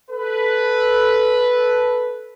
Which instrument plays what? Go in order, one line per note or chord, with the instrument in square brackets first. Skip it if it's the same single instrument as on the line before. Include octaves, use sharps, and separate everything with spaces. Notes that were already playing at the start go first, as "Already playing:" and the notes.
[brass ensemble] A4 B4